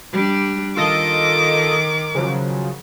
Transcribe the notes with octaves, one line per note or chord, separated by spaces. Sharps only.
G3 D4
D#3 F4 A4 D#5 D6
C#3 F3 F#3